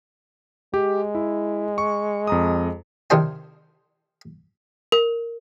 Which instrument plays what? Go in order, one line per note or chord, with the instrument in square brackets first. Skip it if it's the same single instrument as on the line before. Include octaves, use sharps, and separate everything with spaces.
[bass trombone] G#3 [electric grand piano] G4
[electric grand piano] E4
C#6
F2 A#5 D#6
[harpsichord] C3 D#3 D4 C5 G#5
[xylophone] A#4